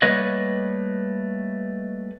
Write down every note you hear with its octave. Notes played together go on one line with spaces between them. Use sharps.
G3 A3 A#3 B4 C#5 D#5